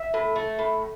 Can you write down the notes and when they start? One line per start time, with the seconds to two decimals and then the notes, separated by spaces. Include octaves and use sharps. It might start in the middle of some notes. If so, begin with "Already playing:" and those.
Already playing: E5
0.14 A2
0.36 A3
0.59 A2